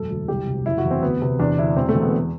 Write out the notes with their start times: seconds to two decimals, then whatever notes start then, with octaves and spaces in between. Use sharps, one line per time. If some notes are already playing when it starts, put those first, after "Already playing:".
Already playing: E1 F#2 A4
0.10 D2
0.28 C2 G4
0.47 C3
0.66 F#1 E4
0.78 F#4
0.85 E2
0.91 C4
1.02 D2 B3
1.22 C3 B3
1.39 E2 D4
1.58 D3 E4
1.76 E1 C4
1.89 A3
1.95 E2
2.02 B3